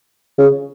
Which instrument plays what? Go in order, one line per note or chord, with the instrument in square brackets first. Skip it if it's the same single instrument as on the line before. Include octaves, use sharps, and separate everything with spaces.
[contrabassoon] C#3